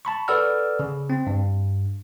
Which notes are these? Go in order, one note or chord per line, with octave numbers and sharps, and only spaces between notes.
A5 B5 C#6
A4 B4 D5 F#5 E6 F6
C#3
C4
G2